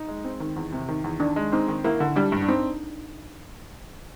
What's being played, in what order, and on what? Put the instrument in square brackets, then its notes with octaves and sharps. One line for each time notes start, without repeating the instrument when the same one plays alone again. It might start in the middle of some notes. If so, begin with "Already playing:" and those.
Already playing: [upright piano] D#4
G#3
C4
D#3
E2
C3
D#3
E2
[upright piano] D#3 [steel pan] D4
[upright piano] G#3
[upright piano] C4 [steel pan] D#4
[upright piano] D#3
[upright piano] A#3 [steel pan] E4
[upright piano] D3
[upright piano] G3 [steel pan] D4
[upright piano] G2
[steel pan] D4
[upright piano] C4 [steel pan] D#4